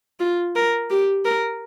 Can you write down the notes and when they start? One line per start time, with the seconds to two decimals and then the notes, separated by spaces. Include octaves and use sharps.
0.19 F4
0.55 A#4
0.90 G4
1.25 A#4